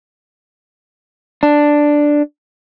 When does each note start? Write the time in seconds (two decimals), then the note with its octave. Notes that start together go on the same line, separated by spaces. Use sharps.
1.43 D4